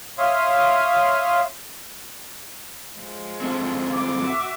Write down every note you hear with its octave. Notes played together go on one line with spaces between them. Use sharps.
C#5 E5 F5 C6 D#6
F3 G#3
C4 E4 A4
D6
F#4 E5